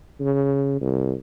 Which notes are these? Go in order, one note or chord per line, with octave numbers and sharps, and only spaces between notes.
C#3
C2